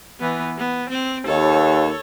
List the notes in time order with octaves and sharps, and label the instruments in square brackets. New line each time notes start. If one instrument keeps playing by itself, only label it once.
[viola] E3 B3
B3
C4
[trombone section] D#2 [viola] A4 C#5